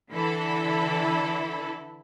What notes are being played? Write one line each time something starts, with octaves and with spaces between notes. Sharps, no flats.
D3 E3 E4 A4 B5